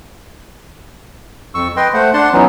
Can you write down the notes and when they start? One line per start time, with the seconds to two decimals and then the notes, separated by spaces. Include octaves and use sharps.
1.54 F2 C#6 E6
1.77 B4 D#5 G5 C6
1.94 A3 C5 F#5
2.14 D4 F#5 A5 C6
2.33 E3 F#3 B3 C#4 D#4